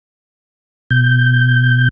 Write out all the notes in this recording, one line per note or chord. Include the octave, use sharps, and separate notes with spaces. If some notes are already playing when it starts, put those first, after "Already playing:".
B2 G6